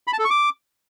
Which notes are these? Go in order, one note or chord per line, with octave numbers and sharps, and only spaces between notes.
B5
A5
A4
C#6
D6